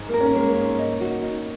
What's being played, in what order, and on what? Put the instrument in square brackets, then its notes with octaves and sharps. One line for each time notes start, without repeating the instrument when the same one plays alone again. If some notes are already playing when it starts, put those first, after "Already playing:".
Already playing: [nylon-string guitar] G#2
[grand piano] A#3 [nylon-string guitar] A#4
[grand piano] C#4
C#4
[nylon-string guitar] G#3 [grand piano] A#3
[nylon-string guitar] G#2
D#4
F#4
D#4